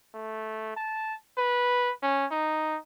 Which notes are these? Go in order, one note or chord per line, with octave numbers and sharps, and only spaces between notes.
A3
A5
B4
C#4
D#4